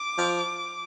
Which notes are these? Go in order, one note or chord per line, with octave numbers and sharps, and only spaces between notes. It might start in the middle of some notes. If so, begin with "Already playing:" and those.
Already playing: D6
F3